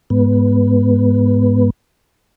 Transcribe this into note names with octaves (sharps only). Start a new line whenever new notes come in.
G#2 B3